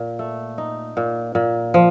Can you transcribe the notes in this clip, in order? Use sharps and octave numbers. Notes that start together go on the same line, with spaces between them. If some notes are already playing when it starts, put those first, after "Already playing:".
Already playing: A#2
A3
D#4
A#2
A#2
F3